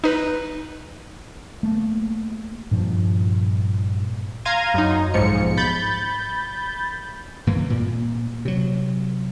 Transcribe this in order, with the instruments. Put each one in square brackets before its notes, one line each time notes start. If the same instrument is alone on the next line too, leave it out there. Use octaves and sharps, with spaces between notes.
[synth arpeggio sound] D#4 B4
[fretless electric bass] A3 A#3
G2 A#2 F3
[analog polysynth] F5 A#5 C6 G#6 D#7
F#2 D#4
B1 G#2 F3 C#7
B5 G6 A6
[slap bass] G2 E3 A#3
A#2
C3 F#3